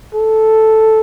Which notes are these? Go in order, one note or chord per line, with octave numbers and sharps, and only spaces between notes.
A4